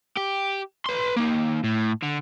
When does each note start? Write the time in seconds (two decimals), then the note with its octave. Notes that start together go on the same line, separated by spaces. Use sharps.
0.17 G4
0.86 B4 C6
1.16 A#3 D#4
1.64 A2
2.03 D3